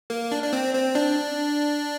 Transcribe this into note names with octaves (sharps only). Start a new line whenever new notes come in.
A#3
D4
D4
C4
C4
D4